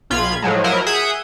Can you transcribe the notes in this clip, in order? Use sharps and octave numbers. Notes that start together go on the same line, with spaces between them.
B1 F4 B5 G#6
A2 F3 F#3 G#3
F3 F#3 E4 A#4 D#5
G#4 E5 F#5 D#6 G6